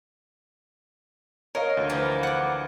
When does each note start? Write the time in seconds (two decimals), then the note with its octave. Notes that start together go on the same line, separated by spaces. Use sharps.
1.55 A#4 C#5 D#5 F5
1.77 D2
1.90 E3 F3 A#3
2.23 F#5 D6